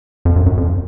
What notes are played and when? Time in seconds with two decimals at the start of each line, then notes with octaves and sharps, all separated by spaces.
0.25 F2
0.36 F#2
0.46 F#2
0.57 F2